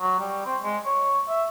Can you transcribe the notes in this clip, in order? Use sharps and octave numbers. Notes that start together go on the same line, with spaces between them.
F#3
G3
C4
G#3
C#5
E5